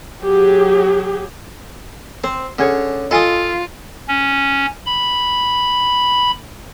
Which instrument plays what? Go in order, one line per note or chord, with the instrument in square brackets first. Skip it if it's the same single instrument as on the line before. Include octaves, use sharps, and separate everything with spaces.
[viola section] F#3 G4 G#4
[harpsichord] C4 [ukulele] C5
[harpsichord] D3 [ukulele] C#4 G#4 C#5
[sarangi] F4 [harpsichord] A4 D#6 [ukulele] D#5 G#5
[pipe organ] C#4
B5